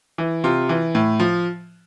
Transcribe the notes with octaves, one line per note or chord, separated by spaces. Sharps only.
E3
C3 F4
E3
A2
F3